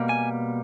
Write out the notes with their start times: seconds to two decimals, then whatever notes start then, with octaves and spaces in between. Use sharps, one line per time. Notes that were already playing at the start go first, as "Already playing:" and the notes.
Already playing: B2 G3 A#3
0.09 G#5